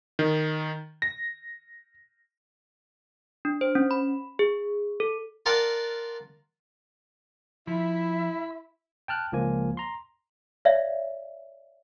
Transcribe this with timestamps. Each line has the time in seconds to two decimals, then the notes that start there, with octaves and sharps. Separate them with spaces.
0.19 D#3
1.02 A#6
3.45 D4
3.61 C5
3.75 C#4
3.91 B5
4.39 G#4
5.00 A4
5.46 F4 A#4 D5 F#5 A5
7.67 F3 E4 E5 B5
9.08 G5 A5 F6 F#6
9.32 C#2 F3 A#3 G#5
9.77 A#5 C6
10.65 C#5 D5 E5 F5